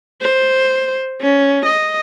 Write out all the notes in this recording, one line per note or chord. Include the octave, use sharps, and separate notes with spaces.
C5
C#4
D#5